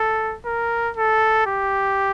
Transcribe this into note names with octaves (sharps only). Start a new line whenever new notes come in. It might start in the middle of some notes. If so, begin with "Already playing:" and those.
Already playing: A4
A#4
A4
G4